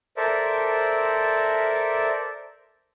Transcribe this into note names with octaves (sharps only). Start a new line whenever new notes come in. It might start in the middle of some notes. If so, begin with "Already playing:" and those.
A4 A#4 C5 D5 E5